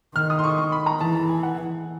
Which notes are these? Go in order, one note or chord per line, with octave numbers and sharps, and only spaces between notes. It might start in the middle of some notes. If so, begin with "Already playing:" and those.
D#3 F6
D#6
C6
C#6
C#6
B5
A#5
E3 A5
A5
G#5
F#5